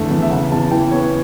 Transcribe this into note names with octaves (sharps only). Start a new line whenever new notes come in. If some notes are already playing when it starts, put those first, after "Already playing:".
Already playing: E2 D3 A3
E2
E5
C#3 F#5
E2 A5
E3 G5
B3 C#5